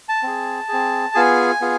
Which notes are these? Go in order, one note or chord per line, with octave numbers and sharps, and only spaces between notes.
A5
C4 G#4
C4 G#4
B3 F4 G#4 G#5
B3 F4 G#4